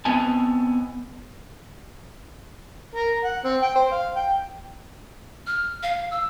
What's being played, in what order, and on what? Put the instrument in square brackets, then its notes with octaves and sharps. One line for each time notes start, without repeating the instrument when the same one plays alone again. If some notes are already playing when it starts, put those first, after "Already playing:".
[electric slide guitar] B3 C4 D#5 G#5 A5
[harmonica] A#4
F#5
C4
G5
C5
F5
G5
[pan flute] F6
F5
E6